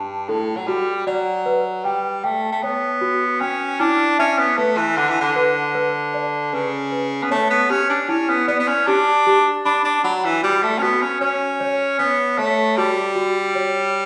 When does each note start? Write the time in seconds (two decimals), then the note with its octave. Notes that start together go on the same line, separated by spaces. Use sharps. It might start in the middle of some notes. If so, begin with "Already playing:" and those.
Already playing: G2 A5
0.28 A2 A4
0.57 F#3
0.68 G3 F#4
1.07 F#3 D5
1.46 B4
1.84 G3 G5
2.24 A3 G5
2.52 A3
2.63 B3 C#5
3.01 F#4
3.41 C#4 G5
3.80 D4 E4
4.19 C#4 E5
4.39 B3
4.58 A3 B4
4.77 E3
4.97 D3 F#5
5.09 E3
5.21 D3
5.36 B4
5.75 B4
6.14 D5
6.53 C#3 B4
6.92 B4
7.23 B3
7.31 A3 C#5
7.50 B3
7.70 C#4 G4
7.89 D4
8.09 C#4 E4
8.29 B3
8.48 B3 D5
8.59 B3
8.68 C#4
8.87 D4 G4
9.27 G4
9.65 D4 B5
9.85 D4
10.04 F#3 B5
10.24 E3
10.43 G3 F#4
10.63 A3
10.78 C#4
10.82 B3 F#4
11.02 C#4
11.21 C#4 C#5
11.60 C#5
11.99 B3 C#5
12.38 A3 C#5
12.77 G3 F#4
13.16 F#4
13.55 C#5